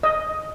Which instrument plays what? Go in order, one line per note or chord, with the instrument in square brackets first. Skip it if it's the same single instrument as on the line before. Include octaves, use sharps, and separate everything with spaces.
[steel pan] D#5